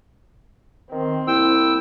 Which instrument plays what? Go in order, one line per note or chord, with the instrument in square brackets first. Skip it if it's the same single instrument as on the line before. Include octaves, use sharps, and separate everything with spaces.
[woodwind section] D#3 [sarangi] C4
[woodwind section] C2 A#3 E4 [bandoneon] G5 E6